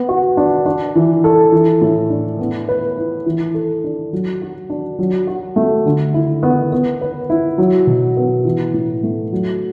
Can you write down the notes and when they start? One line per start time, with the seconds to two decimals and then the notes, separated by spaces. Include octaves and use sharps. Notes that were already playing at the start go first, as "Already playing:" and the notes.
Already playing: B3
0.09 F#4
0.37 D4
0.66 D4
0.95 E3
1.24 A4
1.52 E3
1.82 A2
2.10 D4
2.39 B3
2.69 B4
2.97 E4
3.26 E3
3.54 A4
3.84 D4
4.13 F#3
4.42 F#4
4.70 D4
4.99 F#3
5.27 F#4
5.56 A3
5.86 D3
6.14 E4
6.43 B3
6.72 B3
7.01 B4
7.30 E4
7.58 F#3
7.87 B2
8.17 B3
8.45 E3
8.74 A2
9.03 A3
9.32 F#3